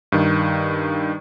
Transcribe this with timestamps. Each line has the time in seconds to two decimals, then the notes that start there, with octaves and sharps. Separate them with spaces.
0.12 G2 D#3